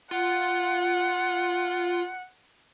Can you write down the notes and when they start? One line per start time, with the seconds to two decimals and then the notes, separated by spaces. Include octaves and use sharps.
0.11 F4 F#5